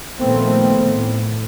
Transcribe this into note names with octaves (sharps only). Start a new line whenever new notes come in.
A#2 D#3 F3 A3 B3 C4
A2